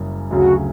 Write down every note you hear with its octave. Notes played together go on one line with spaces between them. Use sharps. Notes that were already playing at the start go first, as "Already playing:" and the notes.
Already playing: F#1 F#2 C#3 G3
D2 C#3 F#3 F#4